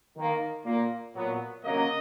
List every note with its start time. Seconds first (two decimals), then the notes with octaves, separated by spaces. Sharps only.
0.16 D#3 A#3
0.65 A#2 A#3
1.15 A#2 F#3 B3
1.63 C#3 F#3 A#3 D#5